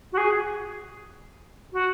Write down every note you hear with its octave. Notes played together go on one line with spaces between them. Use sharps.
F#4
G#4
F#4